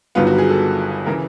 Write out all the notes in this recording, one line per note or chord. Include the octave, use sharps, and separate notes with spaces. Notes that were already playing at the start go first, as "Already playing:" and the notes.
G1 G2 D#3 F#3 B3 F4
F#4
G#4
A4
C#3 E3 A#4